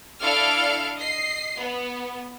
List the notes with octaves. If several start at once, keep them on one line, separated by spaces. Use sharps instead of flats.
D4 E4 A4 F5 F6 D7
D#5 C7
B3